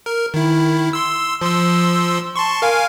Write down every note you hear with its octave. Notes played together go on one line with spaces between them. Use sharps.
A#4
D#3 E4
C6 E6
F3 C6 E6
A5 C6 C#6
A#4 F5 G#5